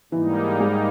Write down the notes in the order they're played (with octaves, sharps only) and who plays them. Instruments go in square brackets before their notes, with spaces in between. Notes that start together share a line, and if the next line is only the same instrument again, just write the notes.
[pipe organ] G#2 G3 A#3 D#4 [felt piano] E3
[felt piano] G#3